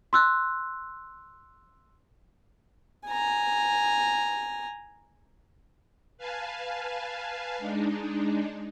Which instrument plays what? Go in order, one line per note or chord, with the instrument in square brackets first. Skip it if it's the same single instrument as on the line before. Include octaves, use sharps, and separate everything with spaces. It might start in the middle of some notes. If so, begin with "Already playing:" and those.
[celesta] C6 E6 F#6
[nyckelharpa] G#5 A#5
[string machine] B4 F5 G#5 A5
G#3 D4 D#4